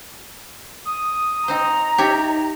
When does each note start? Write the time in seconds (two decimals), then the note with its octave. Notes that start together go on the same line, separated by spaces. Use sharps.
0.85 D#6
1.48 C4 D#4 C5 A#5
1.98 D#4 G4 C#5 E5